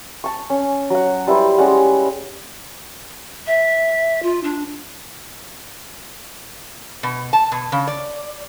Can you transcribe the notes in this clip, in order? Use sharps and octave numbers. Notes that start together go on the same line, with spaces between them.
A5 C#6
C#4
F#3 F#5
G3 E4 B4 C5
G3 G#3 C#4 F#5
E5
F4
D4
B2
A5
B2
C#3
D5